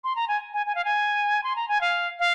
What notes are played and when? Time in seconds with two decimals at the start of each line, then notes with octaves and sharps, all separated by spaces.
0.04 C6
0.16 A#5
0.28 G#5
0.53 G#5
0.66 G#5
0.75 F5
0.85 G#5
1.43 C6
1.56 A#5
1.68 G#5
1.81 F5
2.19 F5